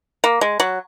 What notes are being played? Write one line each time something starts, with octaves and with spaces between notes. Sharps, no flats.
A#3
G#3
F#3